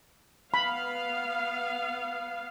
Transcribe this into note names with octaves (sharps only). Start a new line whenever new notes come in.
B3 F5 B5